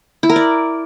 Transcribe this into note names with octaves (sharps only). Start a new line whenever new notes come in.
E4
A#4
D5